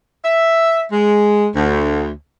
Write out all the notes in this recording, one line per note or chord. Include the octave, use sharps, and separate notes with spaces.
E5
G#3
D2